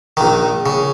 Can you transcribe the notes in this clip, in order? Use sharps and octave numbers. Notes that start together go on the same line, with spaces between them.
A#1 D#3
C#3